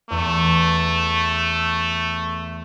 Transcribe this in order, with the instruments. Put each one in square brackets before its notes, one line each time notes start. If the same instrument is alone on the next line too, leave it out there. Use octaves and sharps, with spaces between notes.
[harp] E2 [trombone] A3